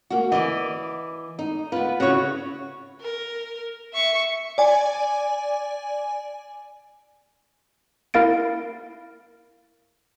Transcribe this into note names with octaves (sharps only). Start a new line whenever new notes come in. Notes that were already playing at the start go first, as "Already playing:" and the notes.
A#3 F#4
E3 D5 D#5
D#4
B3 F4 B4
C#3 E4 F#4 C#5
A#4
E5 C#6
D5 G#5
E4 A#4 F5 A6 D7